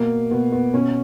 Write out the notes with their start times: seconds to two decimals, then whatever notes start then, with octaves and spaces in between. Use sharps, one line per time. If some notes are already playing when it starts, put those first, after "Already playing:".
Already playing: B2 A#3
0.31 B2 B3
0.52 B3
0.73 B2 C#4